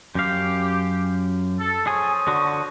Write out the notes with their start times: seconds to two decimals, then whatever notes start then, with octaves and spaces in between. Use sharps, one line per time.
0.15 F#2 G4 F5
1.58 A4
1.87 F3 G#4 C#5 G#5 D#6
2.27 D3 F#4